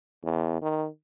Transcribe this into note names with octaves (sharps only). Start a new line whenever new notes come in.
E2
D#3